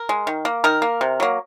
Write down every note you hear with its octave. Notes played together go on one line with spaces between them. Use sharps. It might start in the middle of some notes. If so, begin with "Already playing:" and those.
Already playing: A#4
G#3
D#3
A#3
D#3 A#4
A#3
C3
F#3 A#3